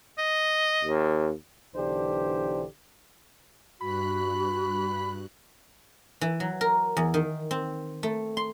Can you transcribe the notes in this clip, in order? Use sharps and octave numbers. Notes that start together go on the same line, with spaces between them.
D#5
D#2
B1 D3 E3 D4 G4 C5
G2 F#4 B5 F#6
E3
F#3
A#4
E2
D#3
C4
A3
C6